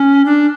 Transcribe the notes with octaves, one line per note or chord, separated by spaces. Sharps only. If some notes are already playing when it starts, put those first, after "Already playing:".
Already playing: C#4
D4